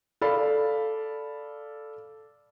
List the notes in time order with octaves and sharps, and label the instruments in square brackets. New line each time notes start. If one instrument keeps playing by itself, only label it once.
[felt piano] A4 D5 F5 B5